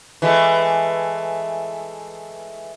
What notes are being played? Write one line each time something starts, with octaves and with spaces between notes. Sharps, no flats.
E3 G#3 A3